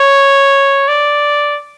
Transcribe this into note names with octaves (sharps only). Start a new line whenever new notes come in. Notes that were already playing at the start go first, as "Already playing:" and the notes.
Already playing: C#5
D5